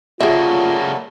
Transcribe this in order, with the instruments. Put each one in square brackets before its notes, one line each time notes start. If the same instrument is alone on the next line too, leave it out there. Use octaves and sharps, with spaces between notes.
[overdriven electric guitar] C#3 A#3 [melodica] F#3 G3 A3 [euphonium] F4 [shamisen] G#4 E5